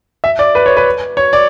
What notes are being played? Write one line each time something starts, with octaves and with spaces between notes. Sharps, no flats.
E5
D5
B4
C#5
B4
C#5
D5